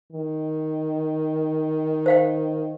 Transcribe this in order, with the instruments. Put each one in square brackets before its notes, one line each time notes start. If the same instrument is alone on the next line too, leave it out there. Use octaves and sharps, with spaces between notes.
[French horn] D#3
[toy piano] C5 F5 G5